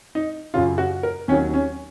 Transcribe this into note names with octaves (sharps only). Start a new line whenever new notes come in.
D#4
F#2 C#3 F#3 F4
F#4
A#4
D#2 D#3 F#3 C#4
C#4